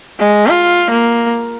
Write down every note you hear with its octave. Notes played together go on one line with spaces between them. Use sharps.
G#3
F4
A#3